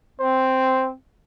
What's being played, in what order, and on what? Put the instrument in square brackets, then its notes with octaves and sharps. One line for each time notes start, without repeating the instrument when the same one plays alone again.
[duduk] C4 [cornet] C5